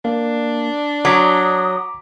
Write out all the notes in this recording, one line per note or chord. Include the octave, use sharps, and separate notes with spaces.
A#3 D4
F#3 A#5 D6 D#6 B6